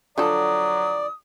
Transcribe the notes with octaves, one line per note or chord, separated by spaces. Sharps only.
D3 F3 F#3 A4 D5 D#6